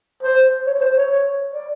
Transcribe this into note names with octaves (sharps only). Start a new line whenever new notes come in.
C5
C#5
C5
C#5
D5